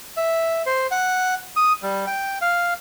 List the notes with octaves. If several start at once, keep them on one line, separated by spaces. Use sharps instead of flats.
E5
C5
F#5
D#6
G3
G5
F5